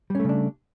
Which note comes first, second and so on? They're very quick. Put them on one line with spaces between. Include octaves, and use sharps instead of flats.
G3 C#4 A3 C#3 D4